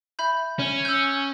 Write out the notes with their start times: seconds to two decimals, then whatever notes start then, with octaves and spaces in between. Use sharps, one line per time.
0.19 E5 B5 G6
0.59 C#4
0.85 E6 G6